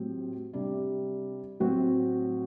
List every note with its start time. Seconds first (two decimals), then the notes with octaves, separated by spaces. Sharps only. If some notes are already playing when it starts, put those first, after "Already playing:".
Already playing: A2 F#3 C4 G4
0.53 C3 G3 D4
1.60 A2 F#3 C4 F#4